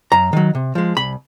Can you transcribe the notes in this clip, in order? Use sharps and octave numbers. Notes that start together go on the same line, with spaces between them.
F#2 A#5
D#3 F#3
C3
F3 G#3
C2 B5